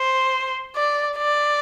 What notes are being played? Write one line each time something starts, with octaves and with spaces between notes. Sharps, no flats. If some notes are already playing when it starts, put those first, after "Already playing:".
Already playing: C5
D5
D5